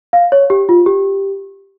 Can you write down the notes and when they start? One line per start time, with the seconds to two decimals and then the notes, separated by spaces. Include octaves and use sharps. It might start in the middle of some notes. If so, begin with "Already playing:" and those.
0.13 F5
0.32 C#5
0.50 G4
0.69 F4
0.86 G4